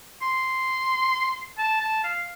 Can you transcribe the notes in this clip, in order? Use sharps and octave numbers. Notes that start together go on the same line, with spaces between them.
C6
A5
A5
F5